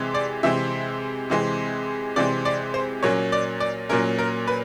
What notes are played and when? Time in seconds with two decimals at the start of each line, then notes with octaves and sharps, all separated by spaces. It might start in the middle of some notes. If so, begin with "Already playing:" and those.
Already playing: C3 E3 G#3 C4
0.14 D5
0.43 C3 E3 G#3 C4 E5
1.30 C3 E3 G#3 C4
2.16 C3 E3 G#3 C4 D5
2.45 D5
2.74 C5
3.03 A#2 F#3 A#3 C#4 C#5
3.32 D5
3.60 D5
3.89 A#2 F#3 A#3 C#4 A#4
4.19 A#4
4.47 B4